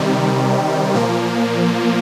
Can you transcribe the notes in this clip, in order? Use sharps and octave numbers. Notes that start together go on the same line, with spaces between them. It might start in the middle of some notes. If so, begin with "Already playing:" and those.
Already playing: C3 D#3 G3
A#2 F3 A#3